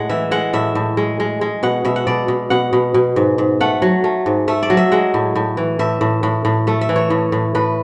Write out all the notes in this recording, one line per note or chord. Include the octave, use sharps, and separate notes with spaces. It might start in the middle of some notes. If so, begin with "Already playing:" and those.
Already playing: A2 G#3 F#5
E3 E5
G#3 F#5
A2 E5
A2
G#3
G#3
G#3
B2 F#5
B2 E5
F#5
B2 D5
B2
B2 F#5
B2
B2
G#2
G#2
A3 F#5
F#3
A3
G#2
A3 E5
D5
F#3
E5
G#3 F#5
A2
A2
E3
A2 E5
A2
A2
A2
A3 E5
E5
E3
C#5
A2
A2
A2 B4